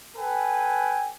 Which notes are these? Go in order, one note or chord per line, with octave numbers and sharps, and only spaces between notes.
A4 B4 G5 G#5